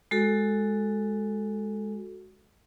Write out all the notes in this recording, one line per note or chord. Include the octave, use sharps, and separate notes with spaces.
G#3 F#4 A4